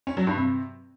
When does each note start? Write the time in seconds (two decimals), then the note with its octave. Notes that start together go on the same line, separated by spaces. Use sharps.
0.07 C#4
0.17 F#3
0.27 G2
0.37 C3